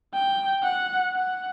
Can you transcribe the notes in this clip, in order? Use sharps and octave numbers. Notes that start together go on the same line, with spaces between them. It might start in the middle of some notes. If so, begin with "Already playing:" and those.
G5
F#5
F#5